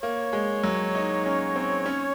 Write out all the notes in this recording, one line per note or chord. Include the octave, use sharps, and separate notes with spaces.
A#3 C#5
G#3
F#3
D#4
C#4
C4
C#4